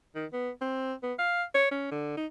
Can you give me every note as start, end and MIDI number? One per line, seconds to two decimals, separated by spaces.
0.16 0.26 51
0.33 0.50 59
0.61 0.94 60
1.03 1.14 59
1.19 1.43 77
1.55 1.67 73
1.71 1.89 61
1.92 2.17 50
2.17 2.26 63